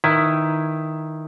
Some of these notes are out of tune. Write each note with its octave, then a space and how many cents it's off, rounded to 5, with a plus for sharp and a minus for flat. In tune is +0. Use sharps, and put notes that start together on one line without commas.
D#3 +0 E4 +5 B4 +0